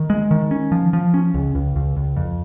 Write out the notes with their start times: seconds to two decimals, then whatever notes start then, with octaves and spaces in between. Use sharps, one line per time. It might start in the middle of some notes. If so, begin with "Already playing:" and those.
Already playing: D#3
0.10 G#3
0.31 D#3
0.51 C#4
0.72 F3
0.93 F3
1.14 C#4
1.34 C#2
1.55 C#2
1.76 C#2
1.97 C#2
2.17 F2